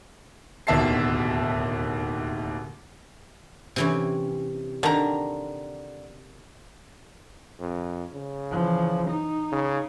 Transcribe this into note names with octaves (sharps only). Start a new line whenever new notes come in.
D1 D#2 B2 E5 A5 C7
C3 E3 C#4
D3 D#3 A#5
F2
C#3
E3 F3
D#4
C#3